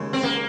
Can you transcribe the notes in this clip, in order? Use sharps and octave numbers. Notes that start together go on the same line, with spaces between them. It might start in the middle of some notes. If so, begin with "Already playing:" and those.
Already playing: D#2 C#3 G#3
C4
A#3